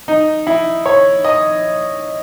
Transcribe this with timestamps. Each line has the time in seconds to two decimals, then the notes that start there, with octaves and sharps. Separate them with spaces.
0.08 D#4
0.47 E4
0.86 C#5
1.25 D#5